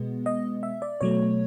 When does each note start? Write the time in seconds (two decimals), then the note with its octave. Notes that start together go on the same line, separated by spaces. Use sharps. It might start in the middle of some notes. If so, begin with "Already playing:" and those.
Already playing: B2 G#3 B3
0.26 D#5
0.63 E5
0.82 D5
1.01 B2 F#3 A3 C#5